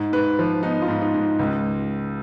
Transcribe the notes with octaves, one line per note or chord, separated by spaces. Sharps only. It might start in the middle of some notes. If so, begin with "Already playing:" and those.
Already playing: G#2
G#2 B4
F3
B3 D#4
F4
G#2
D#4
G#2
C#2